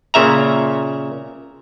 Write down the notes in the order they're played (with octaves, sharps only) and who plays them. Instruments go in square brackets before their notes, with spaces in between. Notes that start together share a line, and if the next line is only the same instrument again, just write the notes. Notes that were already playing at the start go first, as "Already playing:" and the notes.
[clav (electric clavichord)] A#2 C#3 E5 A#5